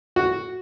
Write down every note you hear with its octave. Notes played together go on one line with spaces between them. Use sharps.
F#4